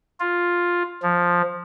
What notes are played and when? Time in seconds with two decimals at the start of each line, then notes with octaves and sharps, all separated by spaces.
0.20 F4
1.02 F3